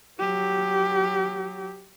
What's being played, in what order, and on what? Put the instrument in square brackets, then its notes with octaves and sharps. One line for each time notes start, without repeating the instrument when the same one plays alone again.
[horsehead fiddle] F#3 G4